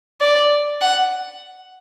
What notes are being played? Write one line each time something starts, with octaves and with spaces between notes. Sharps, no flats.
D5
F#5